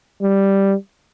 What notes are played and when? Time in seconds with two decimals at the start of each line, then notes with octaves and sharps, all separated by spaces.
0.22 G3